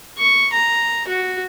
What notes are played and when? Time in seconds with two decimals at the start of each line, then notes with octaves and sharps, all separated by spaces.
0.18 C#6
0.53 A#5
1.07 F#4